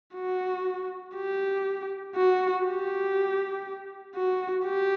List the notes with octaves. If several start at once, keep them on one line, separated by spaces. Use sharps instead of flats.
F#4
G4
F#4
G4
F#4
G4